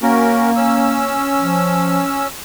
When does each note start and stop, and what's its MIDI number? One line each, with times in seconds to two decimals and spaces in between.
0.02 1.20 58
0.02 0.51 61
0.02 0.51 66
0.02 0.51 70
0.56 2.28 61
0.56 2.28 88
1.37 2.02 53